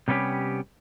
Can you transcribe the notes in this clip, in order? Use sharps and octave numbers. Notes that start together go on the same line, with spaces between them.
C3 G3 B3 C#4 G4